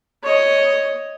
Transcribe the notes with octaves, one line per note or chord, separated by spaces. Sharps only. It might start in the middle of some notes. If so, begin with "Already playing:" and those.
C#5 D#5